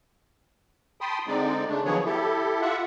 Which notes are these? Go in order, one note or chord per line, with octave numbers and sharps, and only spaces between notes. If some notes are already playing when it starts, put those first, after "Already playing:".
G5 A5 B5 C6 D#6
D3 G#3 C4 D#4 D5
C#3 A3 D4
D#3 F3 F#3 B3 G#4 C#5
E4 G4 A4
F4 E5 F#5